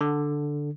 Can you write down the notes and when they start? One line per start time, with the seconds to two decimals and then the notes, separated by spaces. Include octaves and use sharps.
0.01 D3